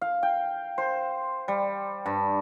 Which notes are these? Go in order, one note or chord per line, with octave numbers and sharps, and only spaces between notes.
F5
G5
C5
G3
G2